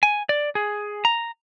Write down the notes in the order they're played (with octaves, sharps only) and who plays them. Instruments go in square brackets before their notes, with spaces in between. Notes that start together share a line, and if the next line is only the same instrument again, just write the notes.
[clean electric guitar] G#5
D5
G#4
A#5